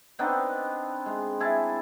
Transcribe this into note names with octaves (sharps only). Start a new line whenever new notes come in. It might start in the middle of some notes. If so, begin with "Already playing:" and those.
B3 C4 D4 D#4
G#3
E4 G#4 A5